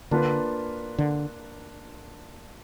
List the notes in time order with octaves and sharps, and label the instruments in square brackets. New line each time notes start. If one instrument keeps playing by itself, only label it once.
[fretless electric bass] D3 [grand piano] A#3 D4 F4 B4
[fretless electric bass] D3